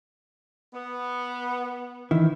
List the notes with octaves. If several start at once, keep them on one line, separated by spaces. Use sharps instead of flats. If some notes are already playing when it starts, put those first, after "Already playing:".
B3
D#3 E3 E4